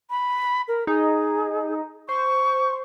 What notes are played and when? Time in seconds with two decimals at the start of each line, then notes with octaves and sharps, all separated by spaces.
0.10 B5
0.68 A#4
0.87 D#4 G#4
2.09 C5 C#6